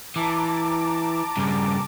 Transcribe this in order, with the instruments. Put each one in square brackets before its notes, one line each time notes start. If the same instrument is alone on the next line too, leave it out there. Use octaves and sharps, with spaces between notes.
[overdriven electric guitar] E3 [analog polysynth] A5 A#5 D6
[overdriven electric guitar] G2 C#3